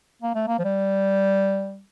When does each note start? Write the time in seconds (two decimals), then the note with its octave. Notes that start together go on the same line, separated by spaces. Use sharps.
0.23 A#3
0.35 A3
0.48 A#3
0.59 F3
0.65 G3